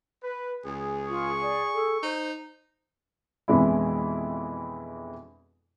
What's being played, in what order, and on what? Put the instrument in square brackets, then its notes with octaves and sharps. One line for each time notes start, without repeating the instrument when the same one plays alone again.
[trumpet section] B4
[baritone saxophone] C#2 [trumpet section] G#4
[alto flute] F4 [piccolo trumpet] C#6
[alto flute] D5
A4
[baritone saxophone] D#4 [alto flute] C5
[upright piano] F2 B2 E3 G#3 D4 E4